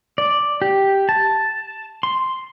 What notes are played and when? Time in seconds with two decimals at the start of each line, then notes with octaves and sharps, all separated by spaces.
0.18 D5
0.62 G4
1.09 A5
2.03 C6